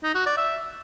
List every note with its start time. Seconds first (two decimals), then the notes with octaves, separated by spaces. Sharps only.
0.03 D#4
0.15 F#4
0.26 D5
0.37 E5